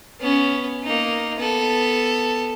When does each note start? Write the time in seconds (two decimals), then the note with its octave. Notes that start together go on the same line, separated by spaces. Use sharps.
0.20 B3 C#4
0.84 A#3 D#4
1.38 B3 A4